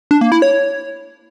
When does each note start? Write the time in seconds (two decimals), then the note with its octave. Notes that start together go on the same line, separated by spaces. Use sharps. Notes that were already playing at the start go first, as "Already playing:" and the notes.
0.11 D4
0.21 A#3
0.32 E4
0.42 C#5